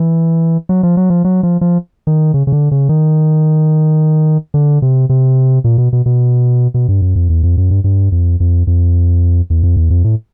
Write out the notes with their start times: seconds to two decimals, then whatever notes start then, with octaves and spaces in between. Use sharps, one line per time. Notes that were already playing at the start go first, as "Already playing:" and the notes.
Already playing: E3
0.69 F#3
0.83 F3
0.97 F#3
1.10 F3
1.24 F#3
1.43 F3
1.61 F3
2.07 D#3
2.34 C#3
2.47 C#3
2.52 D3
2.71 C#3
2.89 D#3
4.54 D3
4.82 C3
5.09 C3
5.64 A#2
5.78 B2
5.93 B2
6.06 B2
6.74 B2
6.88 G2
7.02 F#2
7.16 F2
7.30 E2
7.43 F2
7.57 F#2
7.71 G2
7.84 G2
8.12 F2
8.40 F2
8.67 F2
9.50 E2
9.63 F2
9.76 E2
9.90 F2
10.04 A2